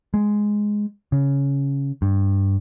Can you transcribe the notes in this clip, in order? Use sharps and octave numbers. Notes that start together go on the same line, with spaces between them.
G#3
C#3
G2